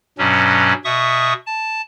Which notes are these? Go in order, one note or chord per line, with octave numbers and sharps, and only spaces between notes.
G2 B2 F#3 C#4
B2 E5 C#6 D#6
A5